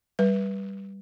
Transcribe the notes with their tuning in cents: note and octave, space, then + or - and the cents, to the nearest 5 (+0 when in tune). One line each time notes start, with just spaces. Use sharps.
G3 +0 B4 -20